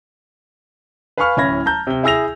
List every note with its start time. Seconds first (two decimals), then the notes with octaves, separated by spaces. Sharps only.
1.18 B4 F5 G#5 B5 C#6 F6
1.37 D1 C#4 E4 B5 G#6 A#6
1.66 A5 A#5 G6
1.87 C3 G7
2.03 E4 G#4 E6 A#6 F7